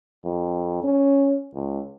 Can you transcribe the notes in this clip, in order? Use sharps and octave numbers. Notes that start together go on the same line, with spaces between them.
F2
C#4
C#2